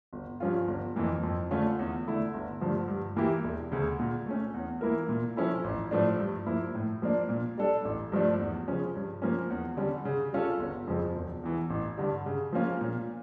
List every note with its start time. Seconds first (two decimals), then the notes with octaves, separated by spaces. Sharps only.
0.13 G1
0.40 G2 F3 C#4 F4
0.68 G1
0.96 F2 E3 A#3
1.23 F2
1.51 D3 A3 C#4 F4
1.79 E2
2.06 D3 A3 E4 A4
2.34 G1
2.61 G2 D3 F3 A3
2.88 G2
3.16 E3 A#3 E4 G4
3.44 E1
3.72 D2 C#3
3.99 A#2
4.26 A3 C#4
4.54 E2
4.81 E3 A#3 E4 A#4
5.09 A#2
5.36 F3 C#4 E4 A4
5.64 A1
5.91 A2 F3 A3 D4
6.20 G2
6.46 F3 A#3 E4
6.75 A2
7.02 F3 A#3 D4
7.29 A#2
7.58 G3 D4 A4
7.85 A1
8.12 G2 F3 A3 D4
8.39 E2
8.68 C#3 F3 C#4
8.95 G2
9.22 F3 A#3 C#4
9.50 E2
9.77 D3 G3 C#4
10.05 C#3
10.33 G3 C#4 F4 A4
10.60 G1
10.87 F2 C#3 F3
11.16 E1
11.43 E2 E3
11.70 A1
11.98 G2 D3 G3
12.26 C#3
12.52 F3 A#3 C#4 F4
12.81 A#2